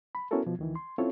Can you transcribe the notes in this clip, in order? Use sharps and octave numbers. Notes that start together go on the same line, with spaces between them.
B5
B3 C#4 E4 F#4 A4 A#4
B2 F3
D2 D#3 E3
C6
C4 C#4 E4 F4 A4 C#5